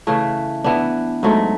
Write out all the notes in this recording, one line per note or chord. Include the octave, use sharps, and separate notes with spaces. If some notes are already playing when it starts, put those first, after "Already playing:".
C#3 E3 A3
E3 B3 D4
G#2 F#3 A3